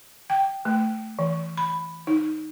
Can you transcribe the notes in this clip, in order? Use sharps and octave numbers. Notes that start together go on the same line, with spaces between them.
G5
A3
E3
B5
D#4